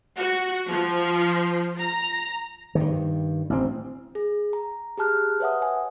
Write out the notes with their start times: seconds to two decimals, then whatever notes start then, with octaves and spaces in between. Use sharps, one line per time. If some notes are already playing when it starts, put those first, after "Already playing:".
0.16 F#4
0.68 F3
1.78 A#5
2.75 G2 D#3
3.50 A1 C4
4.15 G#4
4.53 A#5
4.98 G4 G#4 A5 F6 F#6
5.40 B4 C#5 E5 F#5 D#6
5.62 G#5